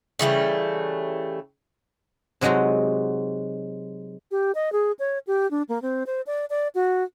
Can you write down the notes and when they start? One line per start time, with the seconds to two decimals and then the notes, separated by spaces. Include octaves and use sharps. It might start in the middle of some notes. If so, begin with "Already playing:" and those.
0.19 C#3 E3 G3 A3
2.41 C3 F#3 G#3 D#4 F#4
4.31 G4
4.55 D#5
4.72 G#4
4.99 C#5
5.27 G4
5.51 D4
5.69 A#3
5.82 C4
6.07 C5
6.27 D5
6.50 D5
6.75 F#4